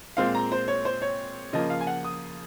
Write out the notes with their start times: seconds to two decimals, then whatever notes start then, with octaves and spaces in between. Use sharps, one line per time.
0.17 A#2 G#3 C4 F5
0.35 A#5
0.52 C5
0.68 C#5
0.85 C5
1.02 C#5
1.53 C#3 F3 A#3 D#5
1.70 F5
1.81 G#5
1.87 F#5
2.05 D#6